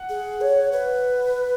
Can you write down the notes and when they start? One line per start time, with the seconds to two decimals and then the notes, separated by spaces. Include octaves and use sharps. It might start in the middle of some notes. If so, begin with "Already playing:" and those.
Already playing: F#5
0.09 G#4
0.41 C#5
0.72 B4